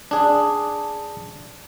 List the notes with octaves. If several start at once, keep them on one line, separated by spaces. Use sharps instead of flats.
D4 G#4